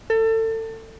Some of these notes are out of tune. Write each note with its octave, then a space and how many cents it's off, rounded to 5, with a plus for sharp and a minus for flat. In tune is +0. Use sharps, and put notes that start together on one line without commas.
A4 +30